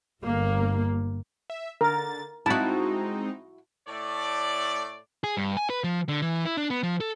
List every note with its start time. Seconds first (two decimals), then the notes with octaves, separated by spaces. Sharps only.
0.21 G1 A#3
1.50 E5
1.81 D3 A#4 A6
2.46 G#3 C4 D#4 E4 F#4 A5
3.87 A2 A3 C#5 D5
5.24 G#4
5.37 G2
5.57 G#5
5.70 B4
5.84 F3
6.08 D3
6.22 E3
6.45 E4
6.57 D4
6.70 B3
6.83 F3
7.00 A4